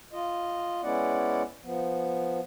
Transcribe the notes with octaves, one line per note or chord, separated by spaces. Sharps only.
F4 D#5
G#3 B3 C#4 E4 D5 F#5
F3 B3